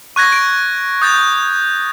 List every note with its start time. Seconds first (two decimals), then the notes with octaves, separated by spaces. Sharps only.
0.16 C#6 F#6 G#6 A#6
0.32 D7
1.02 D#6 G6 A6